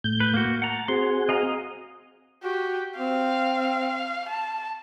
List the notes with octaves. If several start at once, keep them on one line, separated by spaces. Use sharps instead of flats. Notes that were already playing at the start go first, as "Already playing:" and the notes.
A2 G6
B4
A#3 F#4
F#5 A5 A#5
C4 F#4 G#4 C6
D#5 F5 A#5
F#4 G4
C4 F5
A5